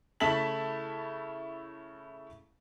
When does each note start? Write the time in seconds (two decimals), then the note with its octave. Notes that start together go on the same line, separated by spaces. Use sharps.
0.20 C#3 A3 E4 A5 B6 F#7